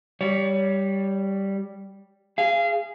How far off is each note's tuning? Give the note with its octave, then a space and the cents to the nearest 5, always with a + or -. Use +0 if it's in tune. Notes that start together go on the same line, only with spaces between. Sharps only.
G3 +0 C#5 +25
G#4 -5 F5 -30